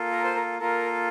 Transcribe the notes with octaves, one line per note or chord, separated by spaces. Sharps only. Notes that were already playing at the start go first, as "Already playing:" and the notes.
Already playing: A#3 F4 A4
A#4
C5
A#4
A#3 F4 A4 A#4